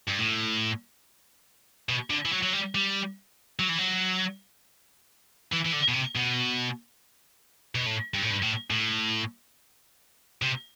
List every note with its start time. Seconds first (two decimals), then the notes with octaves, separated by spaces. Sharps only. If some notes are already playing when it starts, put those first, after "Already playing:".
0.08 G2
0.19 A2
1.89 B2
2.10 D3
2.26 E3
2.32 F#3
2.43 F#3
2.53 G3
2.75 G3
3.59 F#3
3.69 E3
3.78 F#3
5.52 E3
5.65 E3
5.72 D3
5.88 B2
5.94 C3
6.15 B2
7.75 B2
7.86 A2
8.14 G2
8.23 A2
8.31 G2
8.42 A2
8.70 A2
10.42 C3